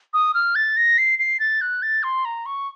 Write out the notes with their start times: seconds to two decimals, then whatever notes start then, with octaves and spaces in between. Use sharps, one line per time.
0.14 D#6
0.34 F6
0.55 A6
0.77 A#6
0.98 C7
1.19 C7
1.40 A6
1.61 F#6
1.83 A6
2.03 C6
2.25 A#5
2.46 C#6